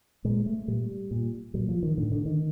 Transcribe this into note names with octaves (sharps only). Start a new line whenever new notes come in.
A#2 G#3
A3
A#2 G3
A#2
A#2 F#3
F3
D#3
A2 D3
D3
D#3